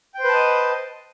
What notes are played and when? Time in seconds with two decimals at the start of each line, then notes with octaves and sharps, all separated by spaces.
0.15 G5
0.19 C5
0.24 B4
0.29 A5
0.34 D#5